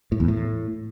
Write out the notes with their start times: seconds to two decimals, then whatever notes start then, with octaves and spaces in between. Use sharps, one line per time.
0.12 A2
0.20 E2
0.28 A2